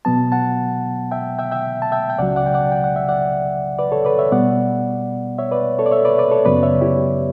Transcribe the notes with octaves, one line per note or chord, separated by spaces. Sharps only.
B2 F#3 B3 A5
F#5 A5
E5 G5
E5 G5
E5 G5
A5
E5 G5
G5
C#2 C#3 F#3 D5 F#5
D5 F#5
G5
D5 F#5
G5
F#5
E5
D5 F#5
B4 D5
A4 C#5
B4 D5
C#5 E5
B2 G3 B3 D5 F#5
C#5 E5
B4 D5
A4 C#5
D5
C#5 E5
B4 D5
B4 D5
A4 C#5
F#2 C#3 F#3 B3 B4 D5
C#5 E5
E4 G4